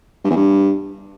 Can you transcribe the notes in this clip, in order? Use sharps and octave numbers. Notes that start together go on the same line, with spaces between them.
G2
E2
G2